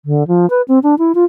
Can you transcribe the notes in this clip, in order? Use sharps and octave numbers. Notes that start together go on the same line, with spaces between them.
D3
F3
B4
C4
D4
E4
F4